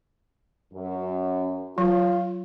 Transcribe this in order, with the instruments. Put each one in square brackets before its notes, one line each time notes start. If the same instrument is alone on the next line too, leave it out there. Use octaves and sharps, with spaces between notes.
[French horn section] F#2
[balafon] F#3 [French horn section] F4